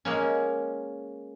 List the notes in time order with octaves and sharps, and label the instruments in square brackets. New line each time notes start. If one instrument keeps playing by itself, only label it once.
[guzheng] G#3 A#3 C#4